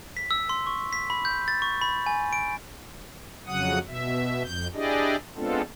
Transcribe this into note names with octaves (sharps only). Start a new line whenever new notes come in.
B6
E6
C6
C#6
B6
B5
G6
A6
C#6
B5
G#5
D7
F2 C#3 F#3 F#5 D#6
B2 E5
F2 G6
D4 E4 G4 G#4 D5 D#5
G#3 B3 C4 D4 F4 A4